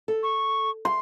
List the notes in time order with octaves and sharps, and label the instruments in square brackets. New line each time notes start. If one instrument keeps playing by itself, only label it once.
[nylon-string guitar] A4
[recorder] C#6
[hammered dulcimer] C6